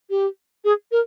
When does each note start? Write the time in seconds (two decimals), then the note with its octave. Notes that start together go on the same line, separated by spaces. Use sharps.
0.10 G4
0.65 G#4
0.92 A#4